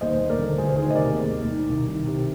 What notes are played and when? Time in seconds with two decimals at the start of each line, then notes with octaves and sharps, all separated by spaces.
0.01 D#2 C5 D#5
0.20 D#2
0.29 A#4 D5
0.39 D3
0.58 D2 G#4 C5
0.76 D#3 G#4 C5
0.90 D#5
0.95 C3 A#4 D5
1.14 D#2
1.32 D#2
1.51 D#3
1.69 C2
1.88 D#3
2.07 C3